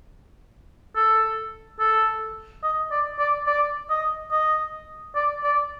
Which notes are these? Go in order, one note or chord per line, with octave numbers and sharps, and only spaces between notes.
A4
A4
D#5
D5
D5
D5
D#5
D#5
D5
D5